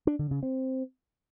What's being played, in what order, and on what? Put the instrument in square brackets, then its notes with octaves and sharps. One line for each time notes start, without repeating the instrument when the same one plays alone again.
[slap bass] D4
D3
C#3
C4